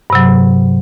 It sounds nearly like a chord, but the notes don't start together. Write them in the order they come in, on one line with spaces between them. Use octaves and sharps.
G2 C3 F#3